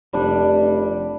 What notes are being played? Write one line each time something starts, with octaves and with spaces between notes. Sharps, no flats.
F1 G3 D4